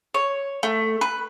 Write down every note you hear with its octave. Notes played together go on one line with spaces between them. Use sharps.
C#5
A3
B4